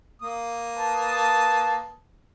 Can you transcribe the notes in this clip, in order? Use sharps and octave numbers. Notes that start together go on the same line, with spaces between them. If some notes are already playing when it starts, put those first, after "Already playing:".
A#3 D#6
B4 A5